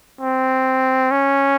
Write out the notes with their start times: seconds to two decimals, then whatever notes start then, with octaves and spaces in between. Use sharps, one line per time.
0.21 C4
1.11 C#4